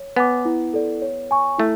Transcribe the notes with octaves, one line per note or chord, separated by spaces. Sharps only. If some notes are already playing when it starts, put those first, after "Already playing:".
Already playing: C#5
B3 G#5 D6
E4
A4 D5
C#5
G#5 C#6
A3 E4